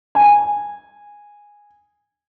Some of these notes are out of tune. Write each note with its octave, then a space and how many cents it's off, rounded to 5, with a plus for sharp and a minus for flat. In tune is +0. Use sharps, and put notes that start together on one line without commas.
G#5 -10